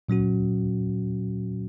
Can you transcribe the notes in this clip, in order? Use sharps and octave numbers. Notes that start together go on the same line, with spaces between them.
A#2 F#3 C#4 F#4